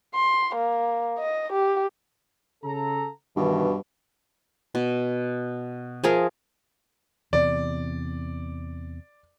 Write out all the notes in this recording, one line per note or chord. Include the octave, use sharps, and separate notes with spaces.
C6
A#3
D#5
G4
C#3 A4 A#5
G2 B2 D#3 E3
B2
F3 G#4 A#4 E5
E2 C3 D5